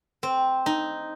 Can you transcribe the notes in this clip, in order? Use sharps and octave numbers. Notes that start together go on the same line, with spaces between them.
C4
D#4